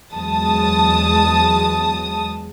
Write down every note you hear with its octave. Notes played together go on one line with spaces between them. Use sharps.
E2 F#3 G#3 A5 D#6